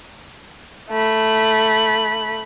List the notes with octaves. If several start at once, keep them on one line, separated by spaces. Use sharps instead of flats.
A3 B5